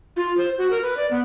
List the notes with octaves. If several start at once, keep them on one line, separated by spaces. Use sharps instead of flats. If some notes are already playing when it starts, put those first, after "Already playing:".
F4
C5
F#4
A#4
B4
D5
B3